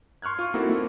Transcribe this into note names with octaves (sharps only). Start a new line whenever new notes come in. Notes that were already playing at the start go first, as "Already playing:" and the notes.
C6 C#6 F6 F#6 G#6
F4 F6
A#3 C4 D#4 E4 F#4 A4
A#3